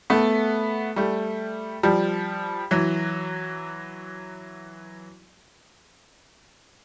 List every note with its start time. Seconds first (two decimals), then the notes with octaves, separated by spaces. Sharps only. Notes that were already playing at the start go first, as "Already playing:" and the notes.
0.10 A3 B3
0.96 G3 A3
1.83 F3 G3
2.71 E3 F#3